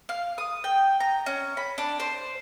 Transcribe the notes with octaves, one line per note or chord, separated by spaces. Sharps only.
F5
D#6
G5
A#5
C#4
B5
D4
C5